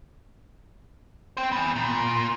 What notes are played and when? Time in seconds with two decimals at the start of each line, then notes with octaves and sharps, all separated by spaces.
1.37 C5 G5
1.52 B3 G#5
1.76 A#2